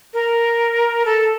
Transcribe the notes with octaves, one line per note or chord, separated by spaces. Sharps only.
A#4
A4